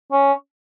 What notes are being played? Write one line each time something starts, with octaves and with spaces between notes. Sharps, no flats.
C#4